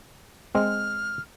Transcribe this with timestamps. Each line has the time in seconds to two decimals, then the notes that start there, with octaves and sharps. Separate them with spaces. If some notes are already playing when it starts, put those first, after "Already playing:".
0.55 G#3 C4 F6